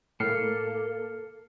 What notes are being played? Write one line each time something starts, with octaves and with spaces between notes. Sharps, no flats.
A2 A#3 A4 F6 C7 C#7